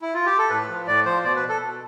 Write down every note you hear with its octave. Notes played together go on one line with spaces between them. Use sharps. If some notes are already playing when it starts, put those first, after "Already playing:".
E4
F4
G4
A4
A2 B4
F3
A2 D5
F3 C5
B2 D5
B4
A4
B2